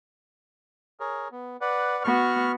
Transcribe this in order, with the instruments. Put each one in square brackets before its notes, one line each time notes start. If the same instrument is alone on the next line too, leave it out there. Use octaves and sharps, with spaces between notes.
[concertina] G#4 A#4 C#5
B3
B4 D5 F#5
[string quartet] B3 F#4 [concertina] C#6 F6